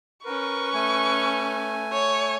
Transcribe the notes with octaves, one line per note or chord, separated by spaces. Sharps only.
C#4 A#4 B4 C#6
A3 G#5
C#5